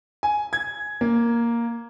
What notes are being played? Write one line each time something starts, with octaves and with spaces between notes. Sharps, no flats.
G#5
G#6
A#3